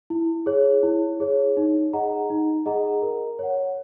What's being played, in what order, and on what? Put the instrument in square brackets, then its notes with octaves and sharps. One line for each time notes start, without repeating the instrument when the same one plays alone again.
[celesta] E4
G#4 C#5
E4
G#4 C#5
D#4
G#4 D#5 F#5 A#5
D#4
G#4 D#5 F#5 A#5
A#4
C#5 F#5